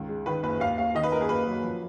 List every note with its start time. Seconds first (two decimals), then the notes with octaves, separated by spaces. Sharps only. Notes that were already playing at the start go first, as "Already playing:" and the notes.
Already playing: C#2 D#3
0.09 G#3
0.26 D#3 B4
0.43 F#1 B4
0.60 D#2 F5
0.78 D#2 F5
0.95 D#3 D#5
1.03 B4
1.12 F#1 A#4
1.21 G#4
1.29 A#3 B4
1.46 F#3
1.64 F3